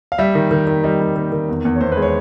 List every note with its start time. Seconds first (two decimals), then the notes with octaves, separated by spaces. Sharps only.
0.12 F5
0.18 G3 E5
0.35 D#3
0.51 D#3
0.67 D#3
0.84 G3 D#5
1.00 G3
1.16 D#3
1.32 D#3
1.49 E2
1.65 E2
1.76 C#5
1.81 E2 C5
1.92 B4
1.97 G#3
2.02 C#5